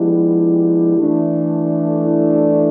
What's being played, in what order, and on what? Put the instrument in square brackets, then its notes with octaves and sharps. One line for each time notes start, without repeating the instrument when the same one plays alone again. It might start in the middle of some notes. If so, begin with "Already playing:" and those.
Already playing: [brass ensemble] F3 G#3 B3 D4 G4 [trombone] E4
[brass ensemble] E3 A3 D4
[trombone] E4